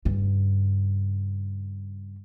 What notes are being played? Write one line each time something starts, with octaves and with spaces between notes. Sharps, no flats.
G2 C#3